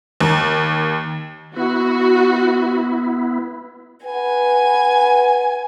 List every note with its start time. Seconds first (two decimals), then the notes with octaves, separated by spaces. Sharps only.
0.20 D#2
1.56 B3 E4 F#4
4.06 B4 F#5 G#5